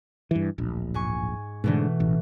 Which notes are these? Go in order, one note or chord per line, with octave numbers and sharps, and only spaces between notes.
G2 E3
D1 A#1
G#2 G#5 C#6
G#2 B2 D3 E3 A3
A1